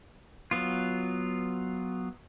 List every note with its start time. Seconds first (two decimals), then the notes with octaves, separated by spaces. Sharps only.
0.51 F#3 B3 F4